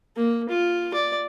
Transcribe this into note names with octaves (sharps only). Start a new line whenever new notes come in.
A#3
F4
D5